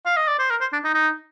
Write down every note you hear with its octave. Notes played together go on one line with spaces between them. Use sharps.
F5
D#5
D5
C5
A#4
C5
D4
D#4
D#4